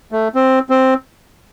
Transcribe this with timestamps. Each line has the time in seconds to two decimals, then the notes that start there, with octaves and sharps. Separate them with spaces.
0.12 A3
0.35 C4
0.70 C4